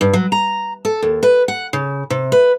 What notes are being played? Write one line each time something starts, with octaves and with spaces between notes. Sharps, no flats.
G2
F#3
A#5
A4
D#2
B4
F#5
C#3
C3
B4